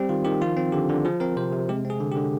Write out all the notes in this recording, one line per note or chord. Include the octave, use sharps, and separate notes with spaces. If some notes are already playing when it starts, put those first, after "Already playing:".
Already playing: G3 C4 G4
D#3 F4
D#3 G4
F3 F4
C4
D3 G4
D3
F3 G#4
C4 A#4
C3 C5
C3
G#3 G4
C4
G#4
D3
G4
D3